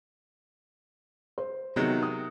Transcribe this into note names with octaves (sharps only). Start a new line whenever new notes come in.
C5
C3 D#3 F#3 B3 D#4 G#4
D#6